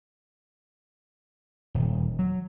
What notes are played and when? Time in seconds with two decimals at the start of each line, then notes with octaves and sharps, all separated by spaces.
1.74 D#1
2.19 F#3